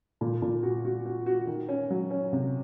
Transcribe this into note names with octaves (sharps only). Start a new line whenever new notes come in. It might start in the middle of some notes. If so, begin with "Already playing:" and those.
A#2
A#2
F#4
F#4
F#4
F#4
D#3
C#4
F#3
C#4
C3